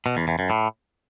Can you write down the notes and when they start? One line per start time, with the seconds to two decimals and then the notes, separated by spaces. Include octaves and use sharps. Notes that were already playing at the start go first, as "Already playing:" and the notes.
0.06 B2
0.17 E2
0.28 E2
0.39 F#2
0.50 A2